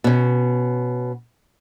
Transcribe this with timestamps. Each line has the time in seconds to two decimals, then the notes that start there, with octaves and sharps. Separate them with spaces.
0.04 B2 C#4